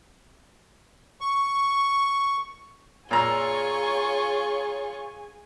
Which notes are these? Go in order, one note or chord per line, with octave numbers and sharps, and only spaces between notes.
C#6
A#2 F4 G#4 C#5 G#5 A#5 C#6 E6